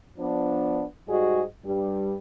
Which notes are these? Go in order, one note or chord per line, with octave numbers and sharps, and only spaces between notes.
F3 B3 D4
G#2 G3 F#4 G#4 D#5
G2 G3